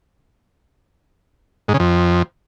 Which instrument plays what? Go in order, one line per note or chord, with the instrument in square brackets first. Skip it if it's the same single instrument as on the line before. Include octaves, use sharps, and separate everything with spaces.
[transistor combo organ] G#2
C#3
F2